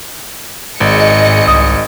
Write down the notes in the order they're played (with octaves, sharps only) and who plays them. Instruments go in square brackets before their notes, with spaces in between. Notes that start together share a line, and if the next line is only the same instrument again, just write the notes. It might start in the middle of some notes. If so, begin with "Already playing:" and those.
[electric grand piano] G#1 [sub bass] G#2 [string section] G#4 D#5 C#7
[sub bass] C2 [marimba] D#6